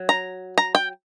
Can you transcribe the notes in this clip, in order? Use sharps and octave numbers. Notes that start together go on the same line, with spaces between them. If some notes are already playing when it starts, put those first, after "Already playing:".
Already playing: F#3
A#5
A#5
G5